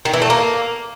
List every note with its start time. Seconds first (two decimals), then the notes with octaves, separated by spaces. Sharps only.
0.05 D#3
0.14 E3
0.22 A3
0.30 A#3